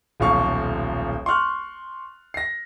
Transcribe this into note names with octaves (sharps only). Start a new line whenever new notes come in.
D#1 B1 F3 F5 C#6
C6 C#6 F6 F#6
A#6 C7